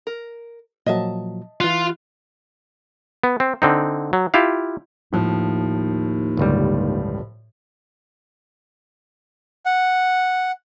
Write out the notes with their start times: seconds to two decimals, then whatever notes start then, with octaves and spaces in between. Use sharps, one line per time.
0.07 A#4
0.86 A#2 F3 F#3 D#5 E5 A5
1.60 E3 F4 F#6
3.24 B3
3.40 C4
3.62 D3 C4 D#4
4.13 F#3
4.34 E4 F4 G4 F5
5.12 D#2 A2 F3
6.37 G1 C#2 G3
9.66 F#5